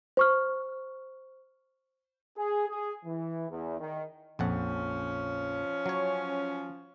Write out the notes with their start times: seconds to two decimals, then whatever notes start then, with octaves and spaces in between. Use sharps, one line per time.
0.17 C5 C#6 F6
2.37 G#4
2.69 G#4
3.05 E3
3.50 E2
3.79 D#3
4.39 A#1 F2 F3 C#4 F#5
5.86 F#3 C#5